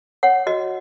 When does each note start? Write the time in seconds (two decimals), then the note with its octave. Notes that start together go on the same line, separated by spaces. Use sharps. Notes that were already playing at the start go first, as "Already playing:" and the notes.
0.23 C#5 F#5
0.47 F#4 D#5